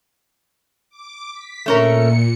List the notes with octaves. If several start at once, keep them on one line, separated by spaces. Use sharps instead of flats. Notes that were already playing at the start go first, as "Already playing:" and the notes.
D6
B6
A#2 A3 C#4 A#4 C#7